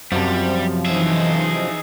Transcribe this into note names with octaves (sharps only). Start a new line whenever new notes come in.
F#2 C3 F3 G3
E3 D#4 G#4 E5